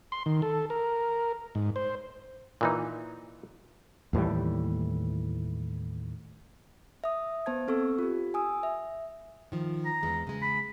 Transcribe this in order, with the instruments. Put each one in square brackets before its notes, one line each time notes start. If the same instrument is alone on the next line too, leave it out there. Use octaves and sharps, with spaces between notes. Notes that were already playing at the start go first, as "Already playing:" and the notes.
[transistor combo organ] C6
D#3
A4
A#4
G#2
C5
[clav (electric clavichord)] A#2 E3 D#4
[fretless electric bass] D#2 A2 E3 G3
[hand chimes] E5 D#6
B3 C5 A5 G#6
C4 A4 C#6 E6
F4 G4
G#5 D#6 E6
E5
[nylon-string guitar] D#3 F3
[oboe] A#5
[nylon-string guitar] E2 G#3
C#3 G#3
[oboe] B5